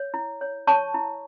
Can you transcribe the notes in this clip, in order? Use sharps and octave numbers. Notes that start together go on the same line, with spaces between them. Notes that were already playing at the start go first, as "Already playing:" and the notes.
Already playing: C#5
E4
C#5
C#5 A5 C#6
E4